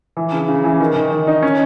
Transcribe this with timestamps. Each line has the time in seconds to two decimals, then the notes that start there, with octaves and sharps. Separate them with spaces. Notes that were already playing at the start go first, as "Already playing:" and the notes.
0.17 E3
0.32 C#3
0.48 C#3
0.64 E3
0.81 D#3
0.96 D#3
1.11 D#3
1.27 D#4
1.42 C#4